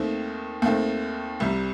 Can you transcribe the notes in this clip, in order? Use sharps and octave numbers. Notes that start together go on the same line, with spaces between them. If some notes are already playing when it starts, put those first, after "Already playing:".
Already playing: D#2 D#3 A3 C4
D#2 D#3 A3 C4
C2 C3 G3